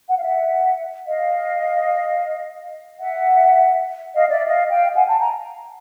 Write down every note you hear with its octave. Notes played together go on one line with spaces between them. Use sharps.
F#5
F5
E5 F#5
D#5 F5
E5 F#5
D#5 F5
D5 E5
D#5 F5
F5 G5
F#5 G#5
G5 A5
G#5 A#5